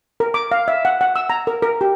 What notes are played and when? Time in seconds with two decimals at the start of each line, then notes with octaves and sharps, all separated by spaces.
0.20 A#4
0.34 D6
0.52 F5
0.68 E5
0.85 F#5
1.01 F#5
1.16 E6
1.30 A#5
1.47 A#4
1.63 A#4
1.81 G4